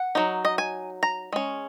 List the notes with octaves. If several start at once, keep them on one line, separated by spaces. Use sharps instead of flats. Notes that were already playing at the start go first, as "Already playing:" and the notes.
Already playing: F#5
F#3 D#4
D#5
G#5
A#5
G#3 C#4